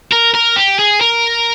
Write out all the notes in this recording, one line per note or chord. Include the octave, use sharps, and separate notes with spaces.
A#4
A#4
G4
G#4
A#4